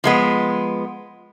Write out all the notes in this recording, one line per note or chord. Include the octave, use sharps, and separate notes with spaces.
F3 G#3 B3